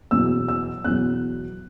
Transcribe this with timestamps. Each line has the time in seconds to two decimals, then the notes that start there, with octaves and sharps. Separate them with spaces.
0.11 E2 B2 F#3 E6
0.48 E6
0.84 E2 B2 F#3 F#6